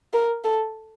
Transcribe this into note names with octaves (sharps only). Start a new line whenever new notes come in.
A#4
A4